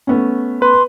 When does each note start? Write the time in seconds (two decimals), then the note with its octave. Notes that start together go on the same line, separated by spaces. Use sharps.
0.07 A3 B3 C#4
0.62 B4 C6